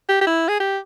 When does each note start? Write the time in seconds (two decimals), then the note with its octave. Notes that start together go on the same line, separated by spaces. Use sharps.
0.09 G4
0.21 G4
0.27 E4
0.49 G#4
0.60 G4